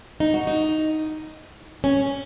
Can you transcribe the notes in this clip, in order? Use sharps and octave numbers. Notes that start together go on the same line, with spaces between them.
D#4
F#4
D#4
C#4